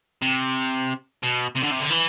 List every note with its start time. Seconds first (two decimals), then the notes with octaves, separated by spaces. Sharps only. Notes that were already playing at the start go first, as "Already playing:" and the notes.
0.22 C3
1.23 B2
1.56 C3
1.63 D3
1.72 C3
1.81 D3
1.91 E3